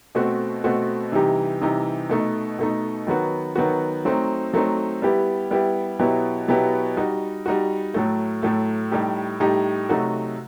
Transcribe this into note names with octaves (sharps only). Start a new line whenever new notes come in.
B2 A3 C4 F#4
B2 A3 C4 F#4
C3 E3 G3 D#4 G4
C3 E3 G3 D#4 G4
B2 A3 D#4
B2 A3 D#4
D#3 F#3 B3 F#4
D#3 F#3 B3 F#4
F#3 A3 C4 D#4
F#3 A3 C4 D#4
G3 B3 E4 G4
G3 B3 E4 G4
B2 F#3 B3 E4 G4
B2 F#3 B3 E4 G4
G3 D#4 F#4
G3 D#4 F#4
A2 F#3 A3
A2 F#3 A3
A2 G3 D#4 G4
A2 G3 D#4 G4
C3 F#3 A3 D#4 F#4